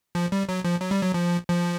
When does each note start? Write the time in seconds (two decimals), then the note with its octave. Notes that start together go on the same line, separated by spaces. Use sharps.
0.15 F3
0.32 G3
0.49 F#3
0.64 F3
0.81 F#3
0.91 G3
1.02 F#3
1.14 F3
1.48 F3